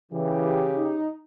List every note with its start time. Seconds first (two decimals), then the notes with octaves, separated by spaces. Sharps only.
0.12 C#3 E3 G4
0.77 D#4